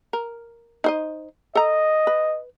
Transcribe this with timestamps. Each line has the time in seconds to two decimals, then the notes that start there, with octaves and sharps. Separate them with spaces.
0.13 A#4
0.84 D#4 C5 D#5
1.55 A4 D#5 A#5
2.07 B4